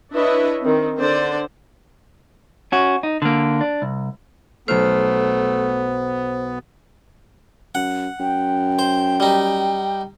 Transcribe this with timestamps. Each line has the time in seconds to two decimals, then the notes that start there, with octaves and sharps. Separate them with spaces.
0.14 D4 E4 B4 C#5 D#5 E5
0.63 D#3 C4
0.97 D3 C5 D5
2.72 C#4 F#4
3.03 D#4
3.22 D3 A#3
3.61 D4
3.82 C2
4.68 B1 A3 B3 C5 F6
7.75 F#2 F#5
8.20 F#2 G5
8.79 C5
9.20 G3 D#4